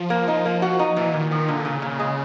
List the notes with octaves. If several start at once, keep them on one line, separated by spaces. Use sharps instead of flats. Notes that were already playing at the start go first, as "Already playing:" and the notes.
Already playing: F3
A#3
D#4
A#3
F#4
D#4
A#2 E3
A#2 D#3
D#3 F3
A#2 D3
A#2 C#3
A#2
G#3